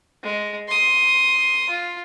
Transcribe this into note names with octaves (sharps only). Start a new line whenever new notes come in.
G#3
C6 D#6
F4